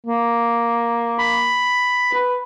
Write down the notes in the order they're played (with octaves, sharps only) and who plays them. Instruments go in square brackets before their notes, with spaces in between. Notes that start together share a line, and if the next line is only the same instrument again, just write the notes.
[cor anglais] A#3
[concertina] B5
[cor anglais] B4